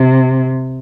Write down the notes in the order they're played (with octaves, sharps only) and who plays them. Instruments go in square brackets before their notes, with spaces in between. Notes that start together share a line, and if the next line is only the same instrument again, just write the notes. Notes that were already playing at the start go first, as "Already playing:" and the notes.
Already playing: [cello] C3